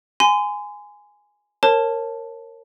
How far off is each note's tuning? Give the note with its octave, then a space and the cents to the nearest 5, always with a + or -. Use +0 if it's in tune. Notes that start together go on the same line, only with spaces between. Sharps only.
G#5 +0 C6 -35
A#4 -15 C#5 -30 A5 +0